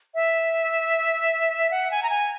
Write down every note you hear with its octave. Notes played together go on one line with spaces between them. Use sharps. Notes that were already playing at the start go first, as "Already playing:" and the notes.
E5
F#5
G#5
A#5
G#5